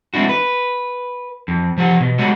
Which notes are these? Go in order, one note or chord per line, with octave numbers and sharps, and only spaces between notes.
G#3 C4 D4 E4 F#4
B4
F2
F3 G4 F#5
B2
G3 G#3 F#4 C#5 F#5